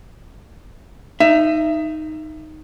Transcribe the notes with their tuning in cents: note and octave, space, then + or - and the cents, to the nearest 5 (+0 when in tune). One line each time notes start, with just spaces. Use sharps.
D#4 +0 E5 +25